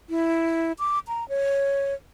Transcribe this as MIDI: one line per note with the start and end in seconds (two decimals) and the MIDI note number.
0.10 0.72 64
0.79 0.99 86
1.08 1.27 82
1.29 1.94 73